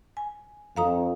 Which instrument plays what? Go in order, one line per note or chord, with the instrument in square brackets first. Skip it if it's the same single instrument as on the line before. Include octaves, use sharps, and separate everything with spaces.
[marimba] G#5
[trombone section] F2 [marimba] F5 A#5 D#6